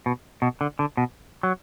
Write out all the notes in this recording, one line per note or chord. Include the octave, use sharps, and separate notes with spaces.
B2
B2
D3
D3
B2
F#3